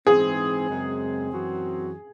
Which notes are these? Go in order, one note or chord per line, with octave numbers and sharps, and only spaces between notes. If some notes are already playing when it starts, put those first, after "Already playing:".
G#2 E3 C4 G#4
F#2 C#3 G#3 C4
F#2 E3 C4 F#4